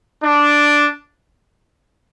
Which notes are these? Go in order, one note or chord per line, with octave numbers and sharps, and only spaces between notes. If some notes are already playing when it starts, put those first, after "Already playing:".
D4